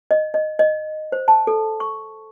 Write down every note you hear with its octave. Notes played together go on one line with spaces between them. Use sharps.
D#5
D#5
D#5
C5
A5
A4
C#6